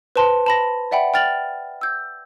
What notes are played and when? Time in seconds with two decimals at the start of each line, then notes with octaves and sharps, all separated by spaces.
0.16 B4 C5 A5 C6
0.46 A5 B5 A#6
0.91 D5 E5 F#5 G5 B5
1.14 G5 F6 A6 F7 F#7
1.81 E6 G6